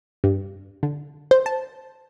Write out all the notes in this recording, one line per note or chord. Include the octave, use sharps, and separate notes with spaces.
G2
D3
C5
A5